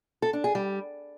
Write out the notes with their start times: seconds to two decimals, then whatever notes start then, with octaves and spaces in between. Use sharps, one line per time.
0.22 A4
0.33 D4
0.44 G#4
0.55 G3